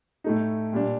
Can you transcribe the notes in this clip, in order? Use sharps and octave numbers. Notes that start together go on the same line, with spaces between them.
A2 A3 D#4
A#2 G3 D4